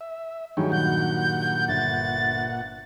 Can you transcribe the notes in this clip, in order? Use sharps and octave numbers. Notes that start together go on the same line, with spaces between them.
E5
G2 D#3 F#3 G#4 C#5 G5
A#2 F#5 G6
G1 A6